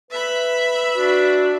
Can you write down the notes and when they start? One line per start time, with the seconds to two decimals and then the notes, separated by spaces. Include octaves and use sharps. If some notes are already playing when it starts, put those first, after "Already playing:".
0.11 B4 E5 B5
0.95 D4 F#4